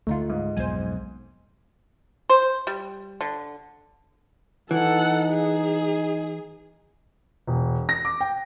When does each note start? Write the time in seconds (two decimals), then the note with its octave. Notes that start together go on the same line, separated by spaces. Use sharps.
0.07 D2 D3 A3 D#4 F4
0.30 G#2
0.57 B1 F2 C5 G#5
2.29 C5
2.67 G3
3.21 D3
4.71 E3 D#4 A4 F#5
5.31 G#4
7.48 E1
7.89 A#6
8.05 D6
8.21 G5